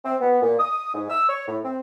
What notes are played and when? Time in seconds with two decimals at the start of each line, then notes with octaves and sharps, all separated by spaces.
0.05 C4
0.20 B3
0.42 A#2
0.60 D#6
0.95 G#2
1.10 E6
1.29 C#5
1.47 A2
1.64 C4